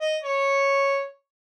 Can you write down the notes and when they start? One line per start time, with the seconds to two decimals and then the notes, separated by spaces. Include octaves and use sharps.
0.01 D#5
0.23 C#5